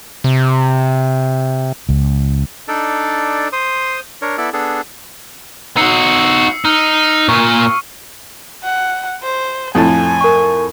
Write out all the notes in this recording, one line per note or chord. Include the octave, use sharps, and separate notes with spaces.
C3
C#2
D4 D#4 A4 D5
C5 C6 D#6
D4 A#4 C#5
B3 E4 A4 D5
B3 D4 G#4 A4
D#4 F#4 E6 C7 C#7
D#4 F6
A#2 A#4 C#6
F#5
C5
F2 A2 G#5 A5
A#4 C#6